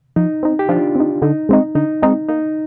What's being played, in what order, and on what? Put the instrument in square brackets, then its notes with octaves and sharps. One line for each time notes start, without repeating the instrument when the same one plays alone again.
[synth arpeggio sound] F3 [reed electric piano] D#4
[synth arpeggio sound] C4 D#4
[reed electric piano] G4
[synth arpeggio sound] F3 [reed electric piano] D4 F4
[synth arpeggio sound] C4 D#4
[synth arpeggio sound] D3 [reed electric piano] D#4
[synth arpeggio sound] G#3 C4 D#4
[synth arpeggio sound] D3 [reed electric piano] D#4
[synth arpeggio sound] G#3 C4 D#4
[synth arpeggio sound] A#3 [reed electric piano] D#4